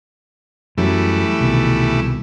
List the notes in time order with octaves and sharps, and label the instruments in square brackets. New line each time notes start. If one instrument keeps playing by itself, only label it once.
[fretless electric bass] F#2 F#3 [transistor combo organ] E3 G3 A3
[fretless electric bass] C2 B2 D#3